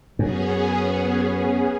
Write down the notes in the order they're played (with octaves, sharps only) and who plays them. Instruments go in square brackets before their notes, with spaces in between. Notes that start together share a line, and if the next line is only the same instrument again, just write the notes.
[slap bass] F#2 [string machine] B3 C#4 G#4